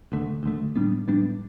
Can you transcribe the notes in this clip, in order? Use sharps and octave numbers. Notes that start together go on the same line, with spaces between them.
D2 D3 A3
D2 D3 A3
A2 G3 B3 D4
A2 G3 B3 D4